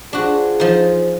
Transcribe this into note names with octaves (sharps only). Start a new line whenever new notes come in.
D4 F4 F#4 G#4 C5
F3 D#4